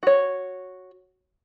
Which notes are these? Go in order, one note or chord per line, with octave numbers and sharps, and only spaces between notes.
F#4 C#5